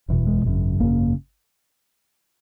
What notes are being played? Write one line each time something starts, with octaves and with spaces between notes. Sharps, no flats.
F#1 E2 B2
G#3
G#1 F#2 C#3
G#1 F#2 C#3 A#3